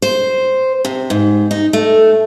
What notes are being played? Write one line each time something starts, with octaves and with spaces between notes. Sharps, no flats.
C5
C3
G#2
D#4
A3